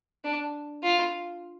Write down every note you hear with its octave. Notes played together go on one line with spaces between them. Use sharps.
D4
F4